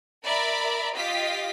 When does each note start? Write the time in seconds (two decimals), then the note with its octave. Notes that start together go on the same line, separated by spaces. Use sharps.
0.23 A#4 D5 E5 A#5 B5
0.94 F4 G4 D#5 F5 B6